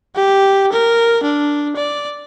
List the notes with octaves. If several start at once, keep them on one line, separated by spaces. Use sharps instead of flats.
G4
A#4
D4
D5